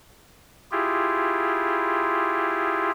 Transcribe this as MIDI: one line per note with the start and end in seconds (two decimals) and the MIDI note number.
0.71 2.91 64
0.71 2.91 65
0.71 2.91 67
0.71 2.91 68